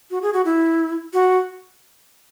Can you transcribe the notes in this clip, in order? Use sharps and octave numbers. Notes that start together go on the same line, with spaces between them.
F#4
G#4
F#4
E4
F#4